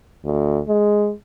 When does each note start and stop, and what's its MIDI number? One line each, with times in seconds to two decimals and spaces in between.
0.24 0.60 38
0.68 1.11 56